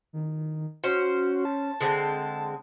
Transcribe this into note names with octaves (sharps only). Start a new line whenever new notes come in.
D#3
C#4 F#4 C5
A5
D3 G#3 C4